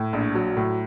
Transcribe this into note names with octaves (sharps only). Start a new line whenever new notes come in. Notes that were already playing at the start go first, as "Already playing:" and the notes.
Already playing: A2
A#1
F#3
A2